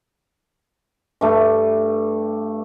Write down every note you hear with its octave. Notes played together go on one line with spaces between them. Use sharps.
G2 A3